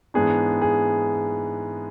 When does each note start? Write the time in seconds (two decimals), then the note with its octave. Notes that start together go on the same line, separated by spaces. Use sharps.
0.14 G#2 E3 B3 D4 G#4
0.62 G#4